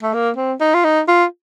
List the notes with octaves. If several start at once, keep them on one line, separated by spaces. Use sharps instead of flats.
A3
A#3
C4
D#4
F4
D#4
F4